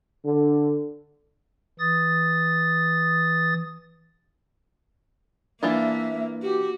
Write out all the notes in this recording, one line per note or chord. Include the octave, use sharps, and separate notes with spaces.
D3
E3 D#6 A6
E3 A#3 D4 F4 E5
F#4 G4